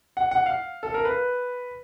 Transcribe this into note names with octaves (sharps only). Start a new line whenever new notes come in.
F#5
F#5
F5
A4
A#4
B4